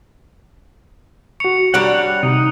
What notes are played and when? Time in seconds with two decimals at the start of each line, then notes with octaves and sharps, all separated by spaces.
1.40 F#4 C#6 C#7 F7
1.74 G3 D4 C#5 F#5 A#5
2.23 C3 D#4